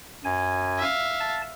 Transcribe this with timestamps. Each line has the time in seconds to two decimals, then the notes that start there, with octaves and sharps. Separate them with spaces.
0.25 F#2 G#5
0.78 E5 F5
1.20 A5